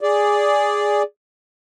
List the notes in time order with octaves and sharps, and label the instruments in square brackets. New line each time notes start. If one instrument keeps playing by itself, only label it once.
[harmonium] G#4 D5